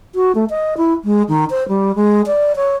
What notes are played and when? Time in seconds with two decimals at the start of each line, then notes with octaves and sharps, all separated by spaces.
0.15 F#4
0.35 A3
0.50 D#5
0.77 E4
1.05 G#3
1.29 D#3
1.50 C5
1.69 G3
1.95 G#3
2.26 D5
2.56 C#5